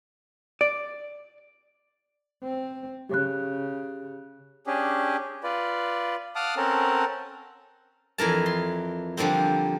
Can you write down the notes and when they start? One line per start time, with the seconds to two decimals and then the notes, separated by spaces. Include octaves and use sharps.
0.61 D5
2.43 C4
3.09 C#3 G4 F#6
4.67 C#4 D4 G4 G#4
5.43 F4 B4 D5
6.36 F5 F#5 A5 D6 D#6 F6
6.57 C4 C#4 A4 A#4 F#5 A5
8.18 F2 E3 A#4 A5
8.46 C6
9.17 D3 F3 G3 A#3 C4